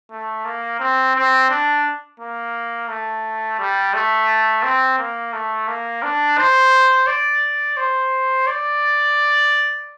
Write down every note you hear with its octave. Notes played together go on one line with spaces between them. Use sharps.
A3
A#3
C4
C4
D4
A#3
A3
G3
A3
C4
A#3
A3
A#3
D4
C5
D5
C5
D5